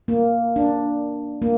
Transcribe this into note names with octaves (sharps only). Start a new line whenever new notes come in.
A#3
D4
A#3